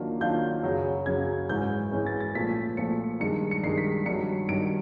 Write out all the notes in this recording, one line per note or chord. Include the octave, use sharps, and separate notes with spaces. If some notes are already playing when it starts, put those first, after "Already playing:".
Already playing: D#3 F#3 A#3 D4 F4
D#3 F#3 A#3 D4 F4 G6
F#2 C#3 F#3
F#2 C#3 F#3 G#6
G#2 E3 G#3 C#4 G6
G#2 E3 G#3 C#4
A6
A6
A#2 F3 A3 B6
A#2 F3 A3 C#7
G2 D#3 G#3 C#7
C#7
G2 D#3 G#3 C7
B6
G2 D#3 F#3 C#7
G2 D#3 F#3 D7